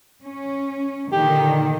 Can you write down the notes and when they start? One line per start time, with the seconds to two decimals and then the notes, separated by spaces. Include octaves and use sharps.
0.22 C#4
1.12 A#2 D3 D#3 G4